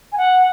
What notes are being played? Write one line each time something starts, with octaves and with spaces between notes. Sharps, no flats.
G#5
F#5